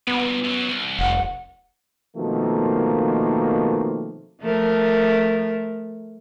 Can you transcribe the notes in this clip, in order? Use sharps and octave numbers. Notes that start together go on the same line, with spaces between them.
G2 A#2 B3
F#2 F#3
C2
F1 F#5
B2 D#3 F3 A3 A#3 C4
F3 A3 A#4